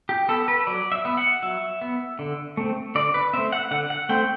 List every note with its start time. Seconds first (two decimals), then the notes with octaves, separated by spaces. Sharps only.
0.09 G4
0.28 B3 A4
0.48 B4
0.67 F#3 D5
0.92 E5
1.05 B3
1.17 F#5
1.42 F#3 E5
1.81 B3
2.19 D3
2.57 A3 C4
2.95 D3 D5
3.14 B4
3.33 A3 C4 E5
3.52 F#5
3.71 D3 F#5
3.90 F#5
4.09 A3 C4 G5